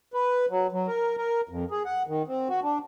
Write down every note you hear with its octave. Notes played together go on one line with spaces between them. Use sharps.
B4
F#3
F#3
A#4
A#4
F2
G#4
F#5
D#3
C4
F#4
D4